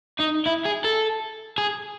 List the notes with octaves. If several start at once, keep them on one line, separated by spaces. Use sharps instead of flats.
D#4
E4
G#4
A4
G#4